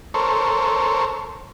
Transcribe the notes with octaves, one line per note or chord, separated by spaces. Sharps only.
A4 A#4 C5 C#5